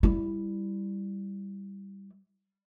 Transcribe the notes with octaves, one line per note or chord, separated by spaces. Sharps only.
G3 E4